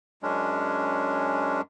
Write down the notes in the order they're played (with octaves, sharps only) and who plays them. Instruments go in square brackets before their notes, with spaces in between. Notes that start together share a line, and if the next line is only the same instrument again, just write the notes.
[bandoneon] F#2 G#3 C#4 D4